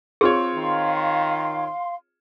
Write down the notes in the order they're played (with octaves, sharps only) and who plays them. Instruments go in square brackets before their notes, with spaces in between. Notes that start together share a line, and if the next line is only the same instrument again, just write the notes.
[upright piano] C4 F4 C#5 [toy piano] G#4
[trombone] D#3 [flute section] F5 C6